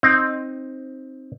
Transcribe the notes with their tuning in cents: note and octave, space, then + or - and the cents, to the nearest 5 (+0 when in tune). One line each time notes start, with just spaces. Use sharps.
C4 +10 D#4 +0